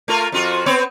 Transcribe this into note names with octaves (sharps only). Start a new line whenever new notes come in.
A3 F4 A#4
F2 F4 F#4
B3 C4 C#5